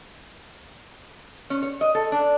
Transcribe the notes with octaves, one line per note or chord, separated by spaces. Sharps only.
C#4
C#5
D#5
A4
D4